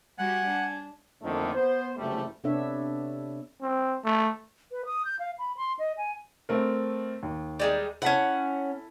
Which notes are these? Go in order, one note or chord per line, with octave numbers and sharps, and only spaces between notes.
G3 F#4 G4 F#5 G#5
D4
F2 A2 D3 D#3 A3 A#3
B3 C5
F#1 C3 E3 G3 A3
C3 B3 D4 A4 C#5 E5
C4
A3
B4
D#6
G6
F5
B5
C6
D#5
G#5
A3 C4 A#4
D#2
G3 G#3 D#4
C#4 E4 A4 F#5 B6